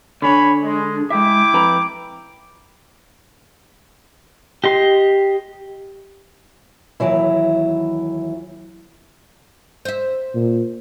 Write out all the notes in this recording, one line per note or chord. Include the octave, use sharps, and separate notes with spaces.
D3 D4 C#5 G#5 B5
G#3
G#3 E4 E5 G5 D6
F2 B4 A#5
G4 D#5 C6
D#2 A#2 E3 F#3 E4
C5 E5
A#2